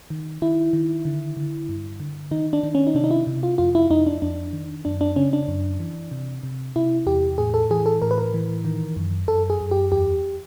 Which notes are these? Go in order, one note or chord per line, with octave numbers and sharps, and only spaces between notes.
D#3
D#3 E4
D#3
D3
D3
G2
D3
D#3 D#4
D4
D#3
C#4
D#4
C3 D4
D#4
E4
C3
F4
F2 F4
E4
F2 D#4
D4
F2 D4
D#3
F#2 D4
D4
C#3 C#4
D4
F#2
E3
C3
C3
C3 E4
E2 G4
A2 G#4
A4
E3 G#4
A4
A2 A#4
B4
A#4
E3
D#3
F#2
F#2 A4
G#4
F#2
G4
E2 G4